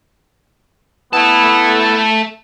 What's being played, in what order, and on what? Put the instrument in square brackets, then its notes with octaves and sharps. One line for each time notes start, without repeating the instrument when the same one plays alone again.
[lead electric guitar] A3 A4 [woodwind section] B3 E4